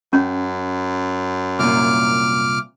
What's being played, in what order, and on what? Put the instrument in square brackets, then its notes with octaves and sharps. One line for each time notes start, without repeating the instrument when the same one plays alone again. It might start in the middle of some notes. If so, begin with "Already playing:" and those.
[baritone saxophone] F#2 [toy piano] C#4
[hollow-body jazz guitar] C2 A#2 [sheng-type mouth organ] D6 F6